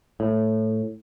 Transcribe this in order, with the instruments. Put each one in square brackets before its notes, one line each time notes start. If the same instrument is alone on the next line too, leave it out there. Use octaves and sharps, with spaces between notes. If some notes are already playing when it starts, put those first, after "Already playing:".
[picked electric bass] A2